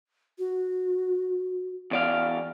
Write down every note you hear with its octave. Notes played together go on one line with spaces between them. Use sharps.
F#4
E2 D5 F5